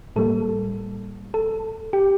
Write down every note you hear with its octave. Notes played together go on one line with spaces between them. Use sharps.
A2 G3 A#3 A4
A4
G4